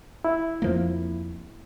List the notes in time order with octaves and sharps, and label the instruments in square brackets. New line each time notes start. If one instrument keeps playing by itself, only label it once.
[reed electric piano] E4
[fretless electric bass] F2 F3 A#3